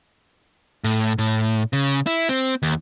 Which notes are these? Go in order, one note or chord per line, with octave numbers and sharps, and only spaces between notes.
A2
A2
C#3
E4
C4
D#2